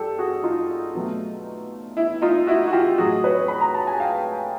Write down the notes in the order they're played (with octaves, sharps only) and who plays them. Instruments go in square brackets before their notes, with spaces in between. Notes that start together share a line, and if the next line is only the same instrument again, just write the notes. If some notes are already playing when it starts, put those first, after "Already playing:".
Already playing: [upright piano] G2 G4 A4
F#4 G#4
D#4 F4
B2 F#3 A3
E4
D#4 F4
E4 F#4
F#4
F4 G4
A2 F#3 A3 F#4 G#4
B4 C#5
B5
A#5
A5
G#5
F5 G5